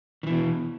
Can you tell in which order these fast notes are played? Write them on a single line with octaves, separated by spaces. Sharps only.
D#3 E3 B2